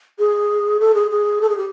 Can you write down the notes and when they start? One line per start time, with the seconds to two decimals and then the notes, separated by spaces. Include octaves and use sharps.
0.19 G#4
0.80 A4
0.95 G#4
1.11 G#4
1.41 A4
1.49 G#4
1.57 G4